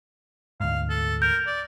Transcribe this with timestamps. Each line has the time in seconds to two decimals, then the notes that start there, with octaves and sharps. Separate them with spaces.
0.60 D2 G#2 F5
0.90 A4
1.22 A#4 G6
1.47 D5